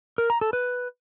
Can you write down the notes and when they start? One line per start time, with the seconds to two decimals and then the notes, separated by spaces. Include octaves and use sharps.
0.18 A#4
0.30 A#5
0.41 A4
0.53 B4